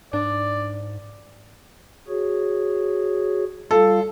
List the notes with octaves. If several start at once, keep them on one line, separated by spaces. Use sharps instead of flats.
G#2 D4 D5
F#4 G#4 C#5
G3 F4 A4 F5